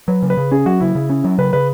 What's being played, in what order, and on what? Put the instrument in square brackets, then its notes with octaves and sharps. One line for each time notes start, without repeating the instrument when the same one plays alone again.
[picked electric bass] F#3 [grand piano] B4
[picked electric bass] C#3
[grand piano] B4
[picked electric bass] C#3
[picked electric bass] C#4 [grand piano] G#4
[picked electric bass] F#3 [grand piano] F#4
[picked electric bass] C#3 [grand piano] E4
[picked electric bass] C#3
C#4
F#3
[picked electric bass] C#3 [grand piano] B4
[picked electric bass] C#3 [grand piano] B4